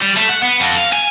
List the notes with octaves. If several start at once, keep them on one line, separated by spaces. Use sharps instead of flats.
G3
A3
F#5
B3
F2
F5
G#5